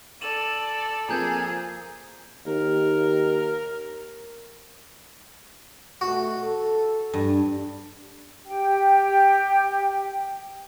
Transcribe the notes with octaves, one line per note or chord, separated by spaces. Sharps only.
A4 D5 D#7 E7 F#7
F3 A#3 C4 G#4 A#5 G6 G#6
D#2 A#4
B2 A3 F#4
A4
G2
G4 G5